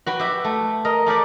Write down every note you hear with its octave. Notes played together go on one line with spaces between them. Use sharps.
F#4 B4 G5
G4 E5
A3
A#4 D#5
A3 G4 A#4 D5